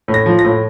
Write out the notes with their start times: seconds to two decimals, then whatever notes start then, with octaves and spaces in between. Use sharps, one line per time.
0.08 A2
0.14 A#6
0.26 F3
0.39 A#6
0.45 A2